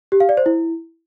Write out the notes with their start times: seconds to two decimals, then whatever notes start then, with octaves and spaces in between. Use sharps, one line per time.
0.12 G4
0.20 F5
0.29 D5
0.37 C5
0.46 E4